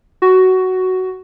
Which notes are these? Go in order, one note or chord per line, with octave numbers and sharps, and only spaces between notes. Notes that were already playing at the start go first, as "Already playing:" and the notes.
F#4